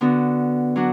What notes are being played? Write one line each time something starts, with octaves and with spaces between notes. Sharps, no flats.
D3 B3 F#4
F#3 D4 F#4